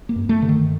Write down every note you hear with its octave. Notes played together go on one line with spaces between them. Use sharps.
A#3
G2
A3
G2 D3
D#3